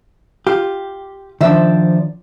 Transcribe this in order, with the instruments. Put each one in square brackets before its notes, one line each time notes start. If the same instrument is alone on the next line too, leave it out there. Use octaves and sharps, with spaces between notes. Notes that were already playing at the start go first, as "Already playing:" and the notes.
[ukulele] F4 [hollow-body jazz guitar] G4
[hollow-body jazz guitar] D#3 F3 D4 [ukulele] C5 E5